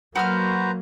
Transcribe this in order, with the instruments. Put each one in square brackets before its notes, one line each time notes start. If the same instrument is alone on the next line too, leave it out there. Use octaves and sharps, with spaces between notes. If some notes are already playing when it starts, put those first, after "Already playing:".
[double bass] F#3 A#3 [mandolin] F#4 E6 F6 [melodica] B4 C5 A#5